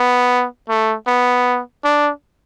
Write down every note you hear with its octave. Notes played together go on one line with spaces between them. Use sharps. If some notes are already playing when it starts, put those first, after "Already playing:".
Already playing: B3
A3
B3
D4